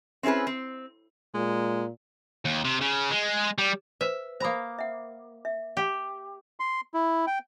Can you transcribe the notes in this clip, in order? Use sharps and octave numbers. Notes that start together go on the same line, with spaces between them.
C4 C#4 E4 G#4 B4
C4
A#2 G#3
D#2
C3
C#3
G#3
G3
B4 C5 E5
A#3 C5 A#5 B5 D#6
E5 F#5
E5
G4
C6
E4
G5